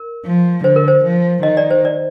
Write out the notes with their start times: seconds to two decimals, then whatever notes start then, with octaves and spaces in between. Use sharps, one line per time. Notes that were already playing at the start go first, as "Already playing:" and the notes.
Already playing: A#4
0.26 F3
0.64 D3 C5
0.76 A#4
0.88 C5
1.04 F3
1.43 D#3 D#5
1.57 D5
1.71 C5
1.85 D5